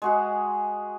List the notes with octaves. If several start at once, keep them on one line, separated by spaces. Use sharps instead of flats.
G#3 F#4 G#4